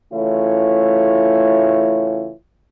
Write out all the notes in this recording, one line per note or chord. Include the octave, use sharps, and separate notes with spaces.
C#3 E3 A3 E4 F4 C#5